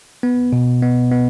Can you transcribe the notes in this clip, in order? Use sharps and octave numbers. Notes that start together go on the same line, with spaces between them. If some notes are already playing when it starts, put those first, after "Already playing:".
B3
B2
B3
B3